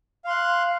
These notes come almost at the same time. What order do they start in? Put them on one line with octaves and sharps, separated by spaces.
F5 C6 F#6